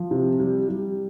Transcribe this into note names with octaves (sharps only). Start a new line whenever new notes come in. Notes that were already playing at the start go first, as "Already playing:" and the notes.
Already playing: F3
C3
G3
G3